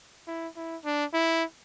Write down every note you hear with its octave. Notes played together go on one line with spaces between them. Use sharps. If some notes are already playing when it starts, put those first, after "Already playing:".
E4
E4
D4
E4